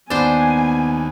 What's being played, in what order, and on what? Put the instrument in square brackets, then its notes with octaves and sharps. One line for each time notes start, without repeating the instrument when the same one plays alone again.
[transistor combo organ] D#2 [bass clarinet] B3 [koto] D4 C5 [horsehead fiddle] G#5